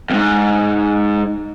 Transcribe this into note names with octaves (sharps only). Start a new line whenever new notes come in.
F2 G#2